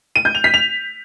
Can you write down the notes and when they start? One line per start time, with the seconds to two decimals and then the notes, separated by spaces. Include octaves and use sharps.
0.16 D#7
0.25 G6
0.35 F7
0.44 B6
0.54 F7